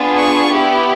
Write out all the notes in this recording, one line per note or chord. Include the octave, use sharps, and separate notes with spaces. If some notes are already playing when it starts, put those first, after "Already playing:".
Already playing: B3 D4 F4 G#4
C#6
B3 E4 G4